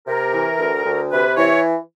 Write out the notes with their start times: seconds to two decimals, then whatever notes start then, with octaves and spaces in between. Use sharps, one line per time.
0.07 C3 A#4
0.33 E3
0.59 D2
0.84 D2
1.10 C3 B4
1.36 E3 C#5